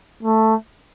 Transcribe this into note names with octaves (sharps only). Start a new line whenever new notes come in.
A3